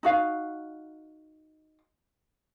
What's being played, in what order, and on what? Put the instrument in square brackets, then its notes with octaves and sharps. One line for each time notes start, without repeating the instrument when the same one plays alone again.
[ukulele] D#4 F#4 F5